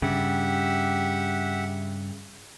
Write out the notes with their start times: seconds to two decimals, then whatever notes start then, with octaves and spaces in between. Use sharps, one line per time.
0.02 G2 C#3 G4 E5 F#5